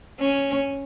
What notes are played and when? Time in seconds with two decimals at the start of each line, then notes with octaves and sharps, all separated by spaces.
0.20 C#4